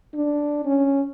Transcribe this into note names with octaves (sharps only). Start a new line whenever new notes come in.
D4
C#4